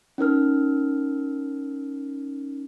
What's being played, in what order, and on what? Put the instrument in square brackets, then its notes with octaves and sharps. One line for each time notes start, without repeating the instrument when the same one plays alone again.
[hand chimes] C#4 D#4 A#4 F6